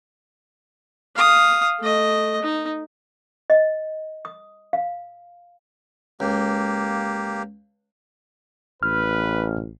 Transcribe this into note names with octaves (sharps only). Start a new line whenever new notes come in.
F5 D#6
A3 D#5
D#4
D#5
D#6
F5
C#2 A#3 G4
A1 B4 F6